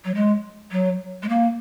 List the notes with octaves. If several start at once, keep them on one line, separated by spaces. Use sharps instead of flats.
F#3
G#3
F#3
G#3
A#3